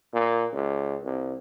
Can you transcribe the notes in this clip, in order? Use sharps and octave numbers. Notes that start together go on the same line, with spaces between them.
A#2
C#2
C2